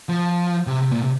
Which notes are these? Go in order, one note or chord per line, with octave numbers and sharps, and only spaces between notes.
F3
C3
C3
A#2
C3